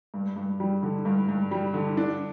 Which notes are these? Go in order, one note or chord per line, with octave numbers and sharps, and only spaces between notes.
G2
G2
G3
D3
G2
G2
G3
D3
D4